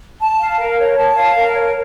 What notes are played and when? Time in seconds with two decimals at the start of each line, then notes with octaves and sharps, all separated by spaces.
0.21 A5
0.40 F5
0.59 A#4
0.79 C#5
0.98 A5
1.15 F5
1.35 A#4
1.54 C#5